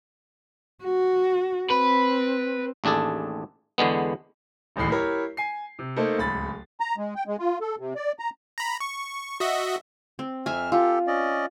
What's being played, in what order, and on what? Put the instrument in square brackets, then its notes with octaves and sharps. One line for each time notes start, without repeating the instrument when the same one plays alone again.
[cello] F#4
[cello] C4 [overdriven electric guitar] B4
[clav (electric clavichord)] A1 D#2 D4 G#4 A4
E2 D3 G#3 B3
[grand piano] D1 A1 D#2 A2 C7
E4 G4 A#4 C#5
G#5 C7
C3
A3 A#3 D#4 A4 C5
D1 C#2 B5 A6
[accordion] A#5
G#3
G5
G#3
F4
A4
C3
D5
A#5
[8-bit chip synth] A#5 B5
C#6
F#4 D#5 E5
[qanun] C4
[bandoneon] F2 F6 [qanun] E5 G#5
[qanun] F4 [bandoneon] G4 A4
[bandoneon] C#4 D5 D#5